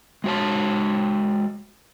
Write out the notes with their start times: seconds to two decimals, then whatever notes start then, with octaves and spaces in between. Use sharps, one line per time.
0.24 G#3 F#4 C#5 A5